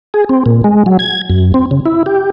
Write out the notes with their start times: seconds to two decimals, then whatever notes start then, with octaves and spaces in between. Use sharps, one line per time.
0.14 G#4
0.29 C4
0.46 A#2
0.64 G#3
0.86 F#3
0.99 G#6
1.30 F#2
1.54 C4
1.71 C#3
1.86 E4
2.06 G4